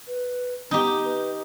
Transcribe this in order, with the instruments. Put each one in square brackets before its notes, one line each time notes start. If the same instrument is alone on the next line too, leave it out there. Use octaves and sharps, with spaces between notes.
[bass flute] B4
[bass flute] B3 [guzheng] D#4 G4
[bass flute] B4